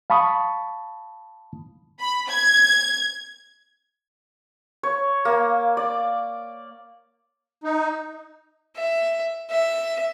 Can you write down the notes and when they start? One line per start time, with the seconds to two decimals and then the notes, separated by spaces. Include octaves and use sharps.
0.10 F5 A5 B5 C#6 D#6
1.99 B5
2.30 G#6
4.83 C#5
5.25 A#3
5.77 D5
7.64 D#4
8.77 E5
9.50 E5